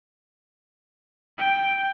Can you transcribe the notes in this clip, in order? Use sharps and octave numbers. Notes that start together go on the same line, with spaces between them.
G5